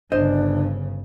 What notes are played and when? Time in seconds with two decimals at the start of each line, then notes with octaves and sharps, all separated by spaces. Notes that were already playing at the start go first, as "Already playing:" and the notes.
0.12 G1 C#3 D4 C5 D#5